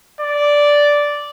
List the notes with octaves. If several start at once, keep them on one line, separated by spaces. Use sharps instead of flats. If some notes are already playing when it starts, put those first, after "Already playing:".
D5